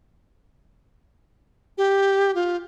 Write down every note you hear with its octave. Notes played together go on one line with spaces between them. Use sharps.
G4
F4